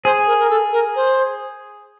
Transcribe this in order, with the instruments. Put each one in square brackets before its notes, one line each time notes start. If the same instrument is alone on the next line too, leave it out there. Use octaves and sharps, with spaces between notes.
[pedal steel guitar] G#4 [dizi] C5
[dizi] A#4
A#4
A4
A#4
C5